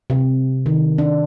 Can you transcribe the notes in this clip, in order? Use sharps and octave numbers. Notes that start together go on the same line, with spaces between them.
C3
D#3
D4